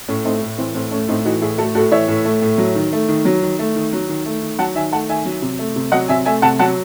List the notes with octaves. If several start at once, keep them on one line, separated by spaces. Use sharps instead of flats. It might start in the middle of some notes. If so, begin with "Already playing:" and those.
A2 C#4
A3 C4 D#4
A2
E3 C4
A2 C4
A3 C#4
A2 C4 D#4
E3 D#4 F#4
A2 E4 G#4
A3 F#4 A4
A2 F#4 A4
E3 C#5 E5
A2
A3
A2
F#3
D#3
A3
D#3
F#3
D#3
A3
D#3
F#3
D#3
A3
D#3
F#3 F#5 A5
D#3 E5 G#5
A3 F#5 A5
D#3 E5 G#5
F#3
C3
A3
C3
F#3 D#5 F#5
C3 E5 G#5
A3 E5 G#5
C3 F#5 A5
F#3 F#5 A5